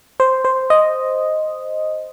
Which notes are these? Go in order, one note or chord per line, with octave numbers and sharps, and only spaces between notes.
C5
C5
D#5